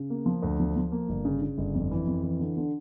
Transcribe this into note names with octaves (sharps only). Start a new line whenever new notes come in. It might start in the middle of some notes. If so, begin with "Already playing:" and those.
Already playing: C#3
A#3
F3
D2
F3
F3
A#3
G1
C#3
C#3
G1
F2
E3
F2
E3
D3
D3